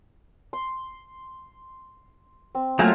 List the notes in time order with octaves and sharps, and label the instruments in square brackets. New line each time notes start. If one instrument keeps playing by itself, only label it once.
[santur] C6
C4
[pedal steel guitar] F#3 A3 A#3 [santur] F4 G#5